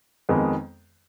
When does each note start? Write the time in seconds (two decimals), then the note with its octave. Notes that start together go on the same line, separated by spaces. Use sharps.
0.29 F2 D#3 G#3 B3